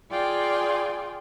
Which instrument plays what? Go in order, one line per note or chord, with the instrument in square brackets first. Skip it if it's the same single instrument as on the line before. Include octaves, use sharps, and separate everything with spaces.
[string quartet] F4 G#4 D5 G5 C6